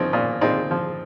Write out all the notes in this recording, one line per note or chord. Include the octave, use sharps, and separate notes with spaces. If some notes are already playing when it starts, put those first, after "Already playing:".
Already playing: F3 C4 C#4 D#4
A#2
A#2 C4 D#4
F3